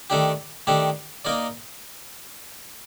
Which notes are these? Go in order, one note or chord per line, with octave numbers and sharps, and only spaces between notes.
D#3 A3 D4 G4
D#3 A3 D4 G4
A#3 D#4 A#4 D5